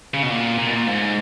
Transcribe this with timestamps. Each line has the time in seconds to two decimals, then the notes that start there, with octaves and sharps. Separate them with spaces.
0.14 C#3
0.22 B2
0.30 A#2
0.58 A#2
0.66 B2
0.74 A#2
0.87 G#2